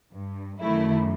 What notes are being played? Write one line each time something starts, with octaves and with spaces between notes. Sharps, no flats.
G2
F#2 D#3 A3 E4